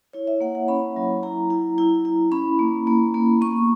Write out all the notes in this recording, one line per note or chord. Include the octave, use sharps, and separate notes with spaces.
E4 C#5
E5
A#3 F#5
F#5
C#4 B5
F#3
E4 A#5
E4
E4
E4
C#4 B5
A#3
A#3
A#3
B3 C#6